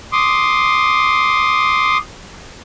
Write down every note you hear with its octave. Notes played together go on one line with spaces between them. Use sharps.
C6 D6 D#6